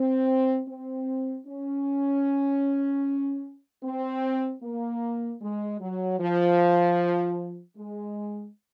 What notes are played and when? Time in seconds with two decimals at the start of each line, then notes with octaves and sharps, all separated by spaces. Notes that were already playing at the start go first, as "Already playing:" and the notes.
Already playing: C4
0.68 C4
1.47 C#4
3.83 C4
4.62 A#3
5.41 G#3
5.80 F#3
6.19 F3
7.77 G#3